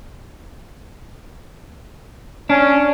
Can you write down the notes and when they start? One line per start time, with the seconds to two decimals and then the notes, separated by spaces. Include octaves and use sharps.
2.50 C#4 D4